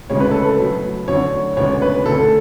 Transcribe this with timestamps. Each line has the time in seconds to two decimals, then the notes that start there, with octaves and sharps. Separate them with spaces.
0.10 D2 C#3 G#3 C#5
0.20 B4
0.31 A4
0.42 B4
0.59 B2 F#3 A3
1.08 D2 D3 F#3 C#5
1.56 D2 C#3 G#3 B3 D4 C#5
1.82 B4
2.05 D2 D3 A3 A4